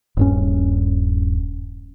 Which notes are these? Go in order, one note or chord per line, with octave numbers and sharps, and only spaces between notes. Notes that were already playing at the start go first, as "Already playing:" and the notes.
D#1 G2 C#4